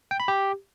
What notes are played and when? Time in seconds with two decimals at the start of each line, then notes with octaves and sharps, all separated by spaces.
0.11 G5
0.20 B5
0.28 G4